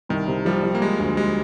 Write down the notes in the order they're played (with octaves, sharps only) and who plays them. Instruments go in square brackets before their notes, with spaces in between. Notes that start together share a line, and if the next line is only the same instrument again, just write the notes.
[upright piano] C2 [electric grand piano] D#3
[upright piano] C3
[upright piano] F3 [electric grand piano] G3
[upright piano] F3
[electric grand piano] A#3
[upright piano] G3 [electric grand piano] G#3
[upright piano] D2
[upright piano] G3 [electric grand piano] G#3